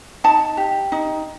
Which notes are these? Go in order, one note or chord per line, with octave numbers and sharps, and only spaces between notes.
D#4 A5
G4
D#4